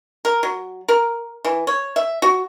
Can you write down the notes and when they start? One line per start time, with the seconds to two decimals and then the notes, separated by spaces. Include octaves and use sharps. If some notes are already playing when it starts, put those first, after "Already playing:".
0.25 A#4
0.43 F#3
0.88 A#4
1.45 E3
1.67 C#5
1.96 E5
2.22 F#4